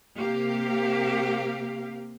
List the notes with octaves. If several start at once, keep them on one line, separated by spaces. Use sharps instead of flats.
C3 A#3 G4 F5